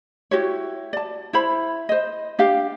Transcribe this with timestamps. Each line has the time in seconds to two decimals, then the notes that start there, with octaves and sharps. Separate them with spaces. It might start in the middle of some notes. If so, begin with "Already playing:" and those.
0.31 E4 F#4 G4 C#5
0.93 D5 A5
1.33 E4 C5 B5
1.89 C5 D#5
2.39 D4 G4 F5